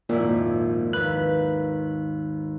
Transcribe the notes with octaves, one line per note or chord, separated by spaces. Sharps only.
G#1 F2 A#2 E4
D#2 B4 B5 F#6